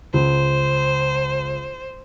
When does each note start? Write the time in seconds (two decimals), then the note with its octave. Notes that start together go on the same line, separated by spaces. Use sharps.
0.14 C#2 C5